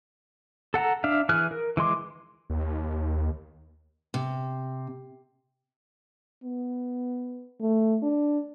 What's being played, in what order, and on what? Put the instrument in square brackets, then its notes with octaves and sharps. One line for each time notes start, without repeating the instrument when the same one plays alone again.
[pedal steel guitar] A4 F#5 A5 A#5
D4 E5 F5
E3 G#4 F6 F#6
A#4
E3 G#3 C6 D6
[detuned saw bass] D#2
[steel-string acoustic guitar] C3
[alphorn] B3
A3
D4